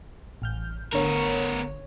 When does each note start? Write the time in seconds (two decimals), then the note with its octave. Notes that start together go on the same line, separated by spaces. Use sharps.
0.42 A1 F6 G6
0.92 G#1 D3 B3 A#4 C#5